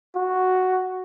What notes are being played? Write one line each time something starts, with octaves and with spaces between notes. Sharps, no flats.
F#4